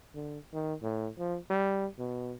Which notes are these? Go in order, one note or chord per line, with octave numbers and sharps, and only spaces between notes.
D3
D#3
A2
F3
G3
B2